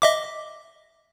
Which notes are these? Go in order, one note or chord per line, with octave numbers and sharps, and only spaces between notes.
D#5 E5 D6